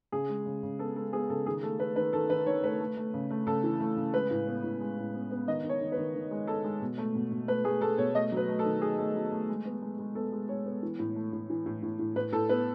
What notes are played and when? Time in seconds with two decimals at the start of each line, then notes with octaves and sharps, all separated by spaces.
0.12 C#3 G#4
0.29 G#3
0.46 C#3
0.63 C#3
0.79 B3 A4
0.96 G#3 A4
1.13 B3 G#4
1.29 C#3 A4
1.46 D#3 G#4
1.63 A3 A4
1.80 A3 B4
1.96 D#3 B4
2.13 D#3 A4
2.30 D#3 B4
2.46 D#3 C#5
2.63 A3 B4
2.80 A3
2.97 A3
3.14 C#3
3.30 A3
3.47 C#3 A4
3.64 E3
3.80 A3
3.97 C#3
4.13 G#3 B4
4.30 A2
4.47 B3
4.64 A2
4.80 G#3
4.97 A2
5.14 B3
5.31 B3
5.47 D#3 D#5
5.64 D#3
5.69 C#5
5.81 D#3
5.92 B4
5.97 D#3
6.14 D#3
6.31 G#3
6.47 G#3 A4
6.64 G#3
6.81 B2
6.98 A3
7.15 B2
7.31 B2
7.48 A3 B4
7.64 A3 G#4
7.81 A3 A4
7.98 B2 C#5
8.15 A3 D#5
8.32 F#3 B4
8.48 A3
8.59 A4
8.65 D#3
8.81 A3 G#4
8.98 A3
9.15 F#3
9.32 A3
9.49 G#3
9.65 B3
9.82 G#3
9.99 G#3
10.15 B3 A4
10.32 G#3
10.49 G#3 C#5
10.66 B3
10.83 E3
10.99 A2
11.15 A3
11.33 A2
11.50 E3
11.66 A2
11.83 A2
11.99 A2
12.16 A2 B4
12.33 A2 A4
12.49 B3 B4